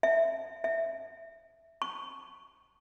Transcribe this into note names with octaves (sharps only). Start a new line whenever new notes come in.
E5
E5
C#6